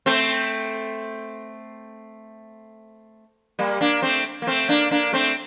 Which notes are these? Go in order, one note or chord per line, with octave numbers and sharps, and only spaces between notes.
A3 C4
G3 A#3
A#3 D4
A3 C4
A#3
A3 C4
A#3 D4
A#3 D4
A3 C4